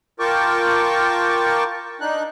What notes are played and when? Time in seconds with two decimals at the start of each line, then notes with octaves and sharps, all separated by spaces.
0.20 F4 A#4 G5 A5 C#6 D6
2.01 D4 D#4 F#6